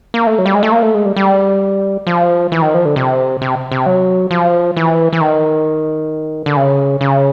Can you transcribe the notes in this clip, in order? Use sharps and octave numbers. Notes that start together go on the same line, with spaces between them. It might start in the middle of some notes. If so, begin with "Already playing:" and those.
A#3
A3
F#3
G3
G#3
A3
A#3
A3
G#3
G3
G3
F3
E3
D#3
F3
D3
C3
C3
C3
F#3
F3
E3
E3
D#3
D3
C#3
C#3